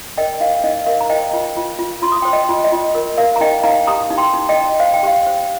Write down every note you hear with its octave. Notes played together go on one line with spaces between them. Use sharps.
A#4 D#5 G5
D#4 F5
D#4 D#5
A#4 F5
A#5
C5 D#5 G5
F4
F4
F4
F4 C6
D#6
C5 G5 C6
D#5 G5
F4
D#5
F4
A#4
A#4 F5
A#5
D#4 D#5 G5
D#4 F5 A#5
G4 A#5 D#6
D#4
G5 C6
D#4
D#5 G5
D#4
C5 F5
G5
G4 F5
C5